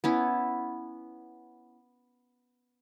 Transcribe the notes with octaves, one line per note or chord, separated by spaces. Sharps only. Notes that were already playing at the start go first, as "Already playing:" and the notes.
B3 C#4 E4